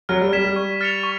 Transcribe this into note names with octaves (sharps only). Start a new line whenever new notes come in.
F#3 F6
G3
G3 G#6 B6 E7
G3
C#6
F6 A6 C#7 F7
C#6